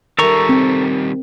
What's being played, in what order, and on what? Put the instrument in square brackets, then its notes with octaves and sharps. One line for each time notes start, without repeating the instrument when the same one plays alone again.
[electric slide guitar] D#3 G3 [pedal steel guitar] A4 A#5 C#6 [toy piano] A#4 E5
[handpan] C4